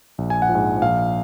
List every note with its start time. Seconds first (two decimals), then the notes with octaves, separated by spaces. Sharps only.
0.18 A#1
0.30 G#5
0.42 F#5
0.49 F3
0.55 G#2 G#5
0.82 A#1 F5